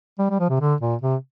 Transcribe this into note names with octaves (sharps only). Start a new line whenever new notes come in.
G3
G3
F3
C3
D3
A#2
C3